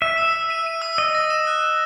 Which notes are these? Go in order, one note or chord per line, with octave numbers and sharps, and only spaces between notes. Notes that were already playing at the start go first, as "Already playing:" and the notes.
E5 D#7
E6
E6
D#7
D#7
E6
D#5 E6
A#6
E7
F#6
F#6